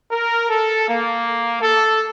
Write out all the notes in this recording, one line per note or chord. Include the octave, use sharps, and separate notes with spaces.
A#4
A4
A#3
A4